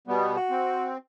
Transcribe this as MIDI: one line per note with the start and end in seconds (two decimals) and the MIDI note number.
0.08 0.36 47
0.08 0.36 55
0.08 0.36 59
0.37 0.90 66
0.50 0.97 60